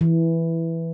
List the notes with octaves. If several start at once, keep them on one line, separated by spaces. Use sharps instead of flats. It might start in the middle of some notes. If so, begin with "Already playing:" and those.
E3